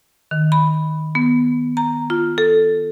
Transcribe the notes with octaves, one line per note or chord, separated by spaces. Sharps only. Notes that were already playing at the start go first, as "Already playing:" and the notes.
D#3
B5
B3
A#5
F4
A4